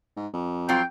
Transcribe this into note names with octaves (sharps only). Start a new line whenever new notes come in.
G#2
F2
F#3 C4 F4 G5